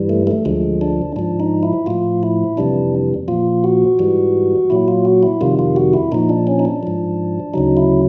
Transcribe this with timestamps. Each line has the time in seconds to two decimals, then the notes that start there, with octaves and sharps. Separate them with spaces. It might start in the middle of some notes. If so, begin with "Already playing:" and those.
Already playing: G2 E3 G3
0.09 A3
0.27 A3
0.45 D2 D3 F3 G#3
0.81 D4
1.16 G#2 F3 D4
1.40 D#4
1.63 E4
1.86 A2 F3 F4
2.23 E4
2.57 F2 C3 E3 G3 D4
3.28 A#2 F3 F4
3.64 F#4
3.99 G#2 E3 G3
4.70 A#2 F#3 E4
4.88 F4
5.05 F#4
5.23 E4
5.41 F2 C3 D#3 G3 F4
5.59 F4
5.76 F#4
5.93 E4
6.12 A#2 F3 D#4
6.29 D4
6.47 C#4
6.59 D#4
6.65 D4
6.83 G#2 F3
7.54 D2 C#3 F#3 D#4
7.77 E4